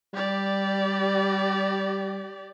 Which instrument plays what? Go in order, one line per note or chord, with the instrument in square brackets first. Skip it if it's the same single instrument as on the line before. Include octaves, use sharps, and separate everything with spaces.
[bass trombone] G3 [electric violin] G4 D5